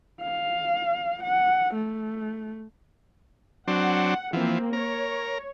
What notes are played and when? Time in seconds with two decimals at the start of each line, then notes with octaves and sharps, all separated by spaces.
0.22 F5
1.23 F#5
1.74 A3
3.68 F#3 C4 D4 F#5
4.33 E3 F3 A#3 C4
4.73 A#4 C#5